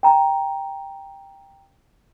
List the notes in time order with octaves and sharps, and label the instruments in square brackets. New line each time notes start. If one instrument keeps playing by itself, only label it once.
[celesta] G5 A#5